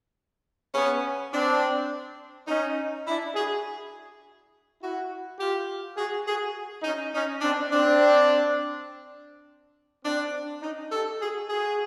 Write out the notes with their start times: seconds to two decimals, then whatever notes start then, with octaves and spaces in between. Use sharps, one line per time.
0.73 B3 C#4
1.31 C4 D4
2.47 C#4 D#4
3.06 D4 E4
3.35 F#4 G#4
4.80 E4 F#4
5.38 F4 G4
5.96 F#4 G#4
6.26 F#4 G#4
6.83 C#4 D#4
7.13 C#4 D#4
7.41 C4 D4
7.70 C4 D4
10.02 C4 D4
10.60 C#4 D#4
10.90 G4 A4
11.19 F#4 G#4
11.48 F#4 G#4